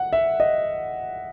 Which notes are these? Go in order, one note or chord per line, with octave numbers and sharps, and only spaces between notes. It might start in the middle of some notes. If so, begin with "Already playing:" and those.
Already playing: F#5
E5
D#5